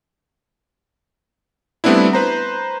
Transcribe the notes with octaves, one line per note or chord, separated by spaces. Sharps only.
G3 A3 B3 C4 D4 E4
B4 C5 A#5